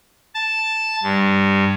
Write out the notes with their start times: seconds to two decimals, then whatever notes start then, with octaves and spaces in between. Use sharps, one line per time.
0.35 A5
1.03 G2